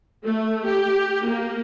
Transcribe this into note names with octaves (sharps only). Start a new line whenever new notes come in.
A3
G4
A#3